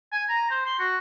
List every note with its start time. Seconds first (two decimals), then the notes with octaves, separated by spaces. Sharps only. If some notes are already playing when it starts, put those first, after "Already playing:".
0.12 G#5
0.29 A#5
0.50 C5
0.66 C6
0.79 F#4